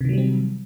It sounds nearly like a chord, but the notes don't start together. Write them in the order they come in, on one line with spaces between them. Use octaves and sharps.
C3 D#3 F#3 G3 C4